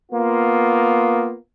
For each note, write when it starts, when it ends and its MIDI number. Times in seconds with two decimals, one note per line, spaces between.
0.12 1.34 58
0.12 1.34 59
0.12 1.34 65